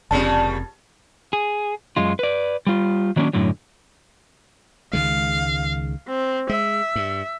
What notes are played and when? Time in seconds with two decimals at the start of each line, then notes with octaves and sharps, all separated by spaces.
0.11 F1 A#2 C#3 G3 C4 A5
1.33 G#4
1.97 F#2 G#3 F4
2.19 B4 D5
2.67 G3 F4
3.16 D#3 F#3 A#3 C#4 D4
3.33 F#2 A2 D3 F#3
4.93 C#2 D#3 G#3 F5
6.08 C4
6.49 G#3 E5
6.96 G2